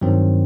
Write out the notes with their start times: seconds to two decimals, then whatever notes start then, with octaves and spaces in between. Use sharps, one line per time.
0.01 G2 D#3 F#3 C4